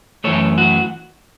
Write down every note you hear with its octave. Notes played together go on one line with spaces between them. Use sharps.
F#2 E3 A3 A4 C#5
F#4